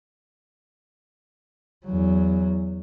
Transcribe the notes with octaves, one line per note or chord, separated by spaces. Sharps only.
E2 F#3